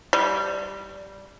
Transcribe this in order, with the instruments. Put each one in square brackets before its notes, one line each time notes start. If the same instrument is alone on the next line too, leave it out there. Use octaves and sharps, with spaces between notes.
[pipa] G3